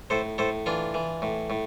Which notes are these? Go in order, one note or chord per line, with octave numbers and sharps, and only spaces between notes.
A2 A4 C5
A2 A4 C5
E3 D4 F4
E3
A2
A2